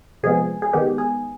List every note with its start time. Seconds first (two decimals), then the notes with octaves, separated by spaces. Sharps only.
0.23 C3 F3 G#3 B3 G#4
0.62 G#4
0.73 D#3 G#3 B3 G4
0.98 G#4